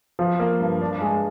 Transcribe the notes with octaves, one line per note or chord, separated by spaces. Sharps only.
F3
A#3
G2
D4
G#3